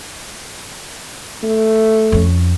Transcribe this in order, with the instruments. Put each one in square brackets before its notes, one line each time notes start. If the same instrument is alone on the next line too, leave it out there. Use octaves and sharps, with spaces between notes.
[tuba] A3
[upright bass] F2 C#4